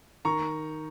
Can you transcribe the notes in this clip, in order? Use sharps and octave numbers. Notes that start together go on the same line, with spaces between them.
D#3 A#5 C#6